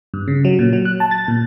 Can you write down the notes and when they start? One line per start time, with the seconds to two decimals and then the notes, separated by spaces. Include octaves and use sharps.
0.14 G2
0.28 C#3
0.45 F#3
0.59 A#2
0.73 F#3
0.85 F#6
1.00 A5
1.11 A6
1.28 A#2